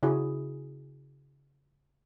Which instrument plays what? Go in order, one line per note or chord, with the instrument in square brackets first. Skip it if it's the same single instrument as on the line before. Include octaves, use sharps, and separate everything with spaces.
[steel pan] C#3 E4 F#4 G#4